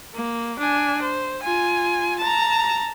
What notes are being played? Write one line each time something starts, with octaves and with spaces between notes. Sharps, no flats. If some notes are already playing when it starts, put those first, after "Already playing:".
A#3
D4 G#5
C5
F4 G#5
A5 A#5